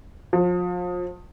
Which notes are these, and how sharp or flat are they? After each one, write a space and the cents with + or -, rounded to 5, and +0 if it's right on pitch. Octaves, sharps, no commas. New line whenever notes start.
F3 +35